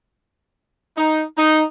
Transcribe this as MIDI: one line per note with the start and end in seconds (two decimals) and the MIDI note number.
0.98 1.23 63
1.38 1.64 63